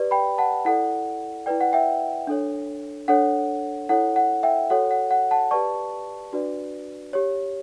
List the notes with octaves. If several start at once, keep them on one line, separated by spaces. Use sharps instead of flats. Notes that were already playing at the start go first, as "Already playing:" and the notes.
Already playing: G4 B4 D5
G5 B5
F#5 A5
E4 A4 D5 F#5
E4 B4 D5 G5
F#5
E5 G5
D4 A4 C#5
D4 A4 C#5 F#5
E4 A4 C#5 F#5
F#5
E5 G5
F#4 A4 C#5 F#5
F#5
F#5
F#5 A5
G4 B4 D5 A5 C#6
D4 F#4 B4 D5
G4 C#5